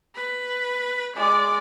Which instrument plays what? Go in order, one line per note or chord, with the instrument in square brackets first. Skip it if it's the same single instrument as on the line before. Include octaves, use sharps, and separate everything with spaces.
[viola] B4
[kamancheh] G#3 D6 [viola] D5